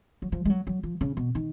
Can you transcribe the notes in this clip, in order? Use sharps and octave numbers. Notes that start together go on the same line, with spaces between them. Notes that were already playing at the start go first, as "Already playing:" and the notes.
F#3
F3
G#3
F#3
F#3
F3
C#3
B2
D#3